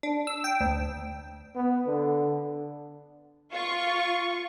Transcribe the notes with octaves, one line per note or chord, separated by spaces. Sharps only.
D4
E6
G5
D2
B3
D3
F4 C#6